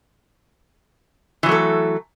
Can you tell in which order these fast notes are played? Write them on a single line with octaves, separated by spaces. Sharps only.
E3 F#3 A3 A4